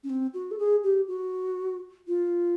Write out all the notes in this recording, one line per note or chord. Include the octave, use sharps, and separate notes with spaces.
C#4
C4
F#4
A4
G#4
G4
F#4
F4